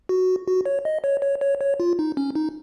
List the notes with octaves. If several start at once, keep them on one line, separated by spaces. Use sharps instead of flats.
F#4
F#4
C#5
D#5
C#5
C#5
C#5
C#5
F4
D#4
C#4
D#4